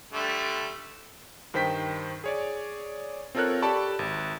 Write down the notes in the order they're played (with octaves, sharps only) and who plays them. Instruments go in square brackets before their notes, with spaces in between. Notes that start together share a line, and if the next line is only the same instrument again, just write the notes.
[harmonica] D3 G3 A3
[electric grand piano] G2 D#3 C5 G5 B6
G#4 C#5 D5
C4 F4 A4 A#4 C#5 F#6
G4 A4 D5 A5 B5 C#6
G#1